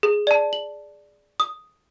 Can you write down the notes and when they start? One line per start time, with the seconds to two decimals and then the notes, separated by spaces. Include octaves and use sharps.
0.03 G#4
0.27 D5 A5
0.53 F#7
1.40 D#6